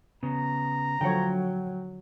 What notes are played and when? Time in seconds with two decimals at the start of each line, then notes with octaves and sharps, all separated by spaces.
0.23 C#3 B3 A#5
1.01 D3 F3 F#3 C#5 F#5 G5